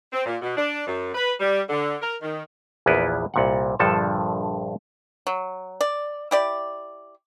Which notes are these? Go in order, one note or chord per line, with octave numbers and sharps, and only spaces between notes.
C4
A#2
B2
D4
F#2
B4
G3
D3
A#4
D#3
A#1 E2 A#3 B3 E4 B4
C2 A#2 F#5
A#1 G2 D3 F3 A4 A5
F#3
D5
E4 G4 D5